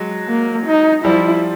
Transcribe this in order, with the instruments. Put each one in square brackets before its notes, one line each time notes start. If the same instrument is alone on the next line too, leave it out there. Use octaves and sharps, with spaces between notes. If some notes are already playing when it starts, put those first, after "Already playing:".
Already playing: [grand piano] F#3 G#3
[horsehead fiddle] A#3
D#4
[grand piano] F3 G3 [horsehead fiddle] E4